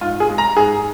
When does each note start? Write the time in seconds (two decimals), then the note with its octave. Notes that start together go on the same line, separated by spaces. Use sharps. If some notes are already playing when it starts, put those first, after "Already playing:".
0.01 G#2 F4
0.20 G#4
0.29 G#3
0.38 A#5
0.57 G#2 G#4